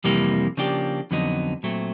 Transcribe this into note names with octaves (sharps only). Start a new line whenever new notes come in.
F2 C3 E3 G3 A#3
C#3 F3 A#3 D4 G4
F2 D3 F#3 B3 D#4
A#2 F#3 A3 C4